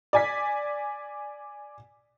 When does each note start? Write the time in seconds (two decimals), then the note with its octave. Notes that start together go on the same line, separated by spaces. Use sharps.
0.13 D5 G#5 B6